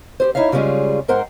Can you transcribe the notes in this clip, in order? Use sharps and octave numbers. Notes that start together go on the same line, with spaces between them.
G4 G#4 C5
D#4 E4 C#5 E5 F5
C#3 G3 G#3 C#4 F4 G#4
G#2 A#4 C5 F#5 G5